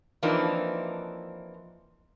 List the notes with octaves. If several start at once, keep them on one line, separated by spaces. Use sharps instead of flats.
E3 F3 A#3 C4 D4 D#4